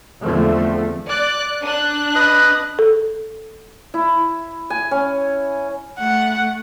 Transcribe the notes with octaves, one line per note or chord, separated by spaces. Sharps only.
E2 D3 F3 A3 C4
D5 F#6
D4 F#6
B4 D#5 D#6
A4
E4
G#5
C#4
A3 F#5